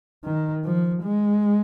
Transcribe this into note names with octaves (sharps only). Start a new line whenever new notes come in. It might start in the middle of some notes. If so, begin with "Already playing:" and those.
D#3
F3
G#3